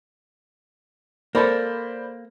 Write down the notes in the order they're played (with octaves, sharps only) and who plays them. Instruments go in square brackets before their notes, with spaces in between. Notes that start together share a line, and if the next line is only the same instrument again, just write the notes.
[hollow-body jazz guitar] A#3 A4 [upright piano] C5 D5 B5